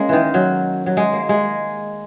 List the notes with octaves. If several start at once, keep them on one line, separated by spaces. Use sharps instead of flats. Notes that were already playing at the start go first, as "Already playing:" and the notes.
Already playing: G#3 A#3 C#4
D#3 E3
F#3
F#3
G#3
A#3
G#3